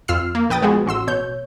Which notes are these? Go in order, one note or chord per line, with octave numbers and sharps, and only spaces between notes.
F2 F4 E6 F6 C7
A#3
A#1 B4 G5 D#6 A6
F3 G#3 B3 F#4 G#4
A1 F#4 C6 E6
B2 C#5 G6